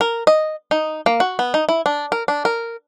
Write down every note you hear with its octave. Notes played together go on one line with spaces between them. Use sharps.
A#4
D#5
D#4
A#3
F#4
B3
D#4
E4
D4
A#4
D4
A#4